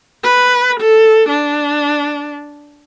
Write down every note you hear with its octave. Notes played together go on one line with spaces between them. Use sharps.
B4
A4
D4